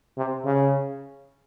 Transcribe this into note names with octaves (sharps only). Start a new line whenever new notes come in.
C3
C#3